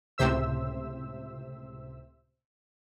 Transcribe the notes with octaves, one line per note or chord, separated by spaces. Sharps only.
C#2 A2 C3 C5 E5 E6